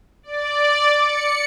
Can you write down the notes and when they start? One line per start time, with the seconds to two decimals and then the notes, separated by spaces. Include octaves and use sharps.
0.23 D5
1.01 C#7